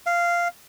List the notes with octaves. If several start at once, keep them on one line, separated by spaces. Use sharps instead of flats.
F5